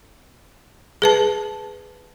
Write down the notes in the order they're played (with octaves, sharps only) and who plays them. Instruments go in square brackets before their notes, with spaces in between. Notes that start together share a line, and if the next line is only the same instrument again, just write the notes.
[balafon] G#4 B4 A5